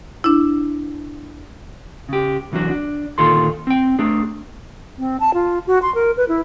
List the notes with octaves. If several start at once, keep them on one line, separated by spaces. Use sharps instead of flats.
D4 E4
C#3 G4
C2 E3 F#3 D4 F#4
D4
D2 A#2 D#3 F4 A4 C6
C4 G5
A3 D4 G#4
C4
A5
F4
F#4
C6
A#4
B4
E4